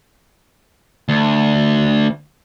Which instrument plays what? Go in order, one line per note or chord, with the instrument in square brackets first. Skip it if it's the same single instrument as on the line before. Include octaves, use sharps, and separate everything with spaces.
[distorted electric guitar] D2